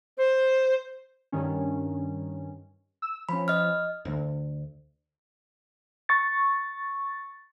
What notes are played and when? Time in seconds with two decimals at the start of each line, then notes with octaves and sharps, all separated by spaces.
0.18 C5
1.32 G2 D#3 C#4
3.02 E6
3.29 F3 C#4 B5
3.48 D#5 F6
4.05 D2
6.09 C#6 A6